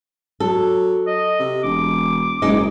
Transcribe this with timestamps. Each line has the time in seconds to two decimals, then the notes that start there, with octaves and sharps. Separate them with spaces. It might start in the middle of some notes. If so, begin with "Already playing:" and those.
0.40 F#3 A4
1.07 D#5
1.40 C3
1.64 E1 D6
2.42 F#1 G#3 D#4